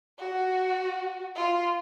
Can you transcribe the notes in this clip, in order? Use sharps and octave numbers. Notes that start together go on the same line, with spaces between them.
F#4
F4